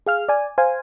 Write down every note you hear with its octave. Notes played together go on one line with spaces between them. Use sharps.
G#4 F5 F6
D5 G#5
C5 F5 G#5